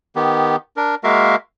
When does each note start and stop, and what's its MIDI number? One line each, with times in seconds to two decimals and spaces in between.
0.16 0.56 51
0.16 0.56 59
0.16 0.56 67
0.77 0.95 62
0.77 0.95 70
1.04 1.36 56
1.04 1.36 58
1.04 1.36 66
1.04 1.36 70
1.04 1.36 76
1.04 1.36 77